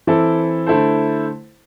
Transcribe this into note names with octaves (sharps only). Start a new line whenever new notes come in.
E3 C4 E4 A4
D3 A3 E4 A4 C5